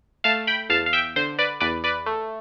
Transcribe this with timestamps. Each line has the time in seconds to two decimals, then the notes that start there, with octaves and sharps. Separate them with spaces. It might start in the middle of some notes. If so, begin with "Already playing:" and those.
0.24 A3 F5 A5
0.47 G5 B5
0.69 E2 F5 A5
0.86 F5
0.93 E5 G5
1.16 D3 C5
1.39 B4 D5
1.60 E2 B4 D5
1.84 B4 D5
2.06 A3